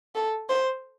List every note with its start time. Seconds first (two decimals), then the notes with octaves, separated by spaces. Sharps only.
0.15 A4
0.49 C5